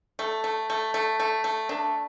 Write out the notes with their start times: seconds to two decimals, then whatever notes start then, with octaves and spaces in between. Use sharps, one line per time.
0.19 A3
0.44 A3
0.70 A3
0.94 A3
1.20 A3
1.44 A3
1.69 D4